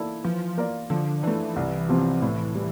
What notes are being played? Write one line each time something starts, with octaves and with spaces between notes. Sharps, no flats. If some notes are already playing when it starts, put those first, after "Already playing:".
Already playing: E3 A#3 E4 A4 D5
E3 F3
A#3 F4 A#4 D5
D3 F3
E3 A3 D4
C2
C3 F3 C4 G4
A2
G3